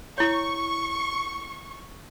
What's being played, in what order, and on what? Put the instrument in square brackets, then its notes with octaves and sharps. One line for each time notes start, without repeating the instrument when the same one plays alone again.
[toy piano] E4 C#5 [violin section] C#6